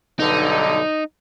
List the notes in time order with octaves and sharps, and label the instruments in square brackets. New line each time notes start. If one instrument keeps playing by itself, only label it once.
[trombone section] B1 G2 D3 [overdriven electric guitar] D#4